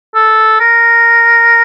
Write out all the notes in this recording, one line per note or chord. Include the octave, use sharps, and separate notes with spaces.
A4
A#4